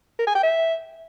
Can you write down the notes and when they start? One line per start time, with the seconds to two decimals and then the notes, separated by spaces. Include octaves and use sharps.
0.19 A#4
0.27 G#5
0.35 G5
0.43 E5